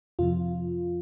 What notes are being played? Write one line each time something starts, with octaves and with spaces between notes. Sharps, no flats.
F2 C3 F3 F4